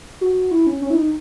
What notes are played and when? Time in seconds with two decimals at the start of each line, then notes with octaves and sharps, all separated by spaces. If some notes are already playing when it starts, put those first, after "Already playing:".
0.21 F#4
0.51 E4
0.67 C#4
0.82 C#4
0.90 E4
0.96 D#4